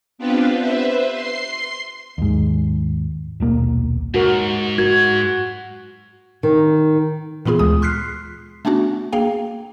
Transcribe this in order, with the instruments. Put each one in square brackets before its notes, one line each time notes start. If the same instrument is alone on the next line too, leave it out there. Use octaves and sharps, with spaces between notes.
[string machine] B3 C4 D4 F4 G4 B4
B4 C5 E5
C6 C7
[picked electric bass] D#2 G#2
D#1 B1 A#3
[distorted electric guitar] G#2 [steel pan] F#4 A#4
[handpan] F#4 [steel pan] A#4 [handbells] G#6
[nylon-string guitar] D#3
[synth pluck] A#2 E3 B3 F4 G#4
D2 G#3 D#6
C6 F6 F#6 B6 C7
A3 B3 C#4 D4 F#4
A#3 G#4 F5 G5